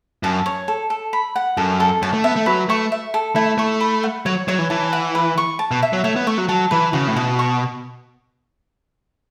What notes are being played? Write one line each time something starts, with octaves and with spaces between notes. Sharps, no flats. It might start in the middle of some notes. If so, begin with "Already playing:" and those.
F#2 A5
C#5
A4
A4
B5
F#5
F#2 A4
A4
F#2 A5
A3
B3 E5
A3
F#3 B4
A3 C#6
E5
A4
A3 E4
A3 C#6
B5
F#5
F#3 C#5
F#3 C#5
E3
E3 A5
F#5
B4
C#6
A5
B2
E5
F#3
A3 C#5
B3
A3 C#6
F#3
F#3 A5
E3 B4
C#3 F#4
A2
B2 F#4
C#6